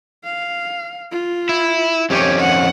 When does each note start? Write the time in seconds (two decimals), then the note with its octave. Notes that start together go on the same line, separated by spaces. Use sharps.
0.24 F5
1.11 F4
1.49 E4
2.10 F2 D#3 C#4 G4 C#5
2.39 F#5